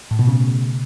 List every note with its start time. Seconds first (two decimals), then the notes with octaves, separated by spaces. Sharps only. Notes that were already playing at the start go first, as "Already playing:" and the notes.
0.11 A2
0.19 B2
0.27 C#3